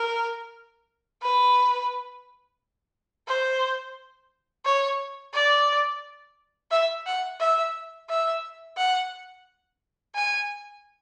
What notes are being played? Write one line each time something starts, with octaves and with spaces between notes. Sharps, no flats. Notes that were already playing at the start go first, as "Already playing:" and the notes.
Already playing: A#4
B4
C5
C#5
D5
E5
F#5
E5
E5
F#5
G#5